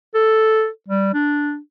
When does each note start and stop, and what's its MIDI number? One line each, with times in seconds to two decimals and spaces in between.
0.15 0.68 69
0.88 1.13 55
1.14 1.58 62